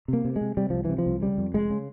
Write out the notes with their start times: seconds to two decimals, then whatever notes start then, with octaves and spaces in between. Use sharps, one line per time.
0.08 C3 A#3
0.25 C3
0.36 G#3
0.41 C3
0.57 C3 G3
0.70 C2 F3
0.85 C3 E3
0.98 F3
1.06 C2
1.21 C#3 G3
1.38 F2
1.54 F1 G#3
1.70 C#3